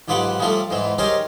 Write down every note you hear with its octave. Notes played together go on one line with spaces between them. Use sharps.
B1 G#2 F4 G4 B4 F#5
C#3 F3 G3 A3 F4 A4
E2 G#2 E3 C4
C#4 D#4 G4 G#4 A#4 C5